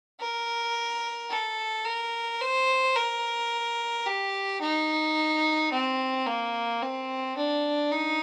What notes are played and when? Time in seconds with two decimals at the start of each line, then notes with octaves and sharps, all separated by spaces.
0.20 A#4
1.30 A4
1.85 A#4
2.41 C5
2.95 A#4
4.07 G4
4.61 D#4
5.72 C4
6.26 A#3
6.82 C4
7.37 D4
7.92 D#4